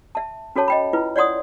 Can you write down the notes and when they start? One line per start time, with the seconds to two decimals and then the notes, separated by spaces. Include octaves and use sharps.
0.15 E5 A5
0.56 C#4 F#4 A4 C#5 A5
0.68 D#5 G5 B5
0.93 E4 F4 B4
1.16 C#5 D5 F#5 C6 D#6